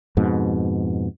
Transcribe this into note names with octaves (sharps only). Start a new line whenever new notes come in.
F2 G#2 B2